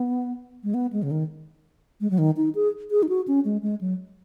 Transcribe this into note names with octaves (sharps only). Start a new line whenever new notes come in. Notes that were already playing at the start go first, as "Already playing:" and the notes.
Already playing: B3
G#3
B3
G#3
C#3
D#3
G#3
F#3
D#3
D#4
G#4
G#4
D#4
F#4
C#4
G#3
G#3
F#3